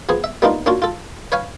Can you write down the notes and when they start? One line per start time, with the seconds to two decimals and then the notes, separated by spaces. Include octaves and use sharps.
0.09 F3 B3 G#4
0.24 E5
0.42 G3 A#3 B3 D4 D#4 F4
0.66 A#3 C#4 D4 F4 F#4
0.82 F4 A4
1.32 B4 C#5 F5 G#5